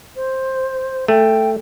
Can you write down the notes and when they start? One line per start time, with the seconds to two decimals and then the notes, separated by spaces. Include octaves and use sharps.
0.16 C5
1.08 A3 G5